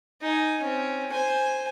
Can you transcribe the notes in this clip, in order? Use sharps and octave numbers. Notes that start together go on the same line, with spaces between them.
D#4 G#5
C4 C#4
C5 G#5